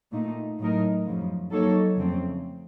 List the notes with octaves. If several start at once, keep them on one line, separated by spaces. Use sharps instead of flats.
A#2 A3 D#4
A2 F#3 A3 D#4 A#4
F#2 C#3 F3
F#3 A#3 D#4 A4 C#5
F2 C#3 A3 C4